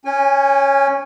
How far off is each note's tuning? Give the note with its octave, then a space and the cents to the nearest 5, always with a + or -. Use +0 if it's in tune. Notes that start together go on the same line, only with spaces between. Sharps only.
C#4 +0 G#5 -30